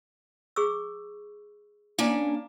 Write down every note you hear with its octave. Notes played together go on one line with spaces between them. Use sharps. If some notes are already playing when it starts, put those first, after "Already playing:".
G#4 C#6 E6
A#3 C#4 D4 F5 A#5